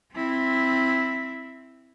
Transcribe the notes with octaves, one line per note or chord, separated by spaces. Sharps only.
C4 E4